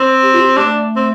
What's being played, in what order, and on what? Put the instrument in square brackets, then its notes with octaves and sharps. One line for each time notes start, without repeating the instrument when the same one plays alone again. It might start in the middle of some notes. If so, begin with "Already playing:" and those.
Already playing: [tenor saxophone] C4
[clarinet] G4
F4
G4
[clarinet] A3 [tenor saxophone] D4
[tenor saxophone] C4